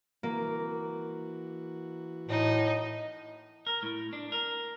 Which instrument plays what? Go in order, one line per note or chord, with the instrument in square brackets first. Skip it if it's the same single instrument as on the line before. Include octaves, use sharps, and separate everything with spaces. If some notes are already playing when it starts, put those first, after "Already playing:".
[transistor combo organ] E3 F#4 [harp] A#3
[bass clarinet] A2 [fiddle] D#4
[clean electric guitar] A#4
A2
D4
A#4